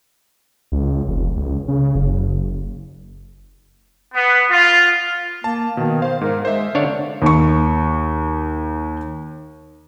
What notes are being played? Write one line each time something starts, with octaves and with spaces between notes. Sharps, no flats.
C#2
F1
C#2
C#3
F#1
B3
F4
A#3 A5
B2 D#3
C5 F5
G#2 A#4
G#3 C5 E5
D3 D4 C#5 F5
D#2 C#6